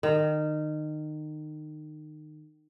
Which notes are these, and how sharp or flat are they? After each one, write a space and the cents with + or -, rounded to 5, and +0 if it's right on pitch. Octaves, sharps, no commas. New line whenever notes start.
D#3 -25